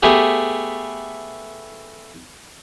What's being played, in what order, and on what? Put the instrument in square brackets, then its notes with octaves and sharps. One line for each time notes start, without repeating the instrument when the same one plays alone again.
[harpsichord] A3 B3 G4 G#4